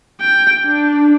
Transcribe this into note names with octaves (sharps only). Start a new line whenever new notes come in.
G5
D4